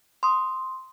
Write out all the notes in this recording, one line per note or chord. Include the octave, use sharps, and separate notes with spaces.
C6 D#6